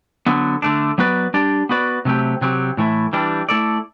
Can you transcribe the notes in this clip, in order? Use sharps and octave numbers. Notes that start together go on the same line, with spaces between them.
D3 F#3 B3
D3 A3 D4
F#3 B3 F#4 B4 D5
G3 D4 G4 D5
B3 F#4 B4 D5
C3 F#3 A3 C4 G4
C3 F#3 C4 G4
A2 E3 A3 E4
E3 G3 D4
A3 E4 A4 D5